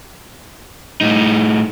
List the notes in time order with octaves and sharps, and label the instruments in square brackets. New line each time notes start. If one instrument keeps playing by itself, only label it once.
[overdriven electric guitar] A2 D#4